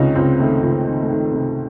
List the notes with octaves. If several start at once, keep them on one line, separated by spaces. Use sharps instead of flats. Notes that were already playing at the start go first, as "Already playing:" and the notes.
Already playing: C#2 C3 D#3 C#4 D#4
C#2 C4
D#3 A3
C#2
C4
D#3
A3
D#3
C3